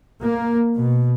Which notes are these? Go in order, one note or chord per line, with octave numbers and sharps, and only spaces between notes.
A#3
B2